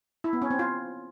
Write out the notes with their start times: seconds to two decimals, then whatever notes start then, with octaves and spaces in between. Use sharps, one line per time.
0.24 E4
0.33 B3
0.42 C#4
0.50 C4
0.59 F4